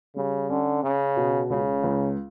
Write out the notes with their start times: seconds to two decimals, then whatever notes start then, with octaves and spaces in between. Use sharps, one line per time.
0.16 C#3 G3
0.50 D3 C#4
0.83 C#3 C#4
1.17 B2
1.50 C#2 C#3
1.83 C#2